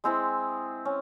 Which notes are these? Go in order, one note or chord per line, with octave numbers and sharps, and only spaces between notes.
G#3 C4 E4 G#4
C#4